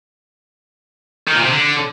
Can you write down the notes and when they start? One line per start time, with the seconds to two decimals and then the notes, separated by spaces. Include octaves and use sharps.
1.27 D#3
1.35 A#2
1.43 C3
1.51 D3